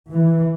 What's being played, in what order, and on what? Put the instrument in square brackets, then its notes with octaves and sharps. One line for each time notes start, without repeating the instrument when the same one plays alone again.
[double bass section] E3